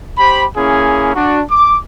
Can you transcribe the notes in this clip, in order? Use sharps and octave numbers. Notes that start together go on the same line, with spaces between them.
G4 C5 B5
A#3 C#4 E4 G#4
D4 F#4
D6